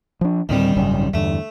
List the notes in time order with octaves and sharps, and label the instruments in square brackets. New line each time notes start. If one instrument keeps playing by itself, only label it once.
[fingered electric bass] F3 D4
[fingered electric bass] D2 A2 C4 [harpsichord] D#3 G3
[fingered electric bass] G#1 F#2 C#3
[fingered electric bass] E2 G2 D3 [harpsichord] A3